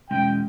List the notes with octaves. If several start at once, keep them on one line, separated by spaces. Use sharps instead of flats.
E2 B2 G#3 C#4 G5